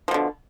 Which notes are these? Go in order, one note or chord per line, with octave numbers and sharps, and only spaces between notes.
B2 D3 F3